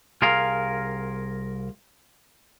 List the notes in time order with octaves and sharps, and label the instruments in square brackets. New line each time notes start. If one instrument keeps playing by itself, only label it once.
[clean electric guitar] C2 F4 G#4 A#4 F5